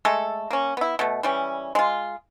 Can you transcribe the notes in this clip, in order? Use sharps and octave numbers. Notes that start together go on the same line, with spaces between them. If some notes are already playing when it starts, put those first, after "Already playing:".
G#3 A3 A4
A#3 C#4
B3 E4
B2 A3
E3 G3 C#4
G#3 F4